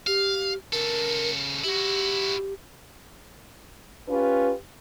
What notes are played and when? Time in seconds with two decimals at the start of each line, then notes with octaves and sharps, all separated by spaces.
0.07 G4 F5
0.73 C#3 A4 A#4
1.64 E4 F#4 G4
4.09 C#4 F4 G4 B4